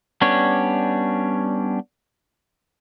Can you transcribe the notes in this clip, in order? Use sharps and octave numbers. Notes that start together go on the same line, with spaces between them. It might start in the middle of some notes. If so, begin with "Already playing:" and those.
G3 B3 C#4 D4 C#5